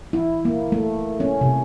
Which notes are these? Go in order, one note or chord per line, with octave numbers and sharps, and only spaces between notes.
E4
A#3
A3
C#4
C3